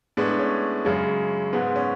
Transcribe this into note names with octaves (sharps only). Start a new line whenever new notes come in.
A2 G#3 B3 D4
C#4
F#2 C#3 G#3
G#2 G#3 B3
C#4